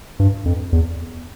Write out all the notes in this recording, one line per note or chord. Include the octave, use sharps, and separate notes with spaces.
G2
F2
E2